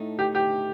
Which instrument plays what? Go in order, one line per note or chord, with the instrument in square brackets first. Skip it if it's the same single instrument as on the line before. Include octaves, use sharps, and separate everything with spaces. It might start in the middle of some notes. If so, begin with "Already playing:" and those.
Already playing: [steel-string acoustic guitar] A2 A3 D#4
[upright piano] G4
G4